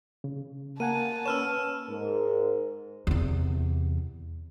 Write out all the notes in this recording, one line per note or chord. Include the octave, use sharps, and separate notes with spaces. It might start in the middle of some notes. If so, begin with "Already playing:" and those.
C#3
A#3 A#4 F#5 G#5 A5 D#7
C#4 B4 C#5 E6 F6 E7
G#2 A#4
E2 C3